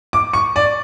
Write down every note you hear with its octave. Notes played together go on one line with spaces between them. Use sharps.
D6
C#6
D5